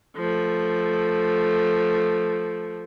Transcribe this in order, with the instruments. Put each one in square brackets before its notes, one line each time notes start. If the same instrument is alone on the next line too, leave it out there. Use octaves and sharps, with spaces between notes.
[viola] F3 A3